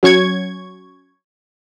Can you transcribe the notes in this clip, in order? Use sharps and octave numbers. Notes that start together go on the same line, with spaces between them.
F#3 C#4 C#6 G#6